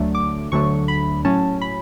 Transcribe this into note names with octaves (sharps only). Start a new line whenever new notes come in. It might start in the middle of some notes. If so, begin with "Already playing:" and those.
Already playing: D2 D3 F#3 A3 D4
D6
D2 D3 F#3 A3 D4 C#6
B5
A2 F#3 C#4 A5
B5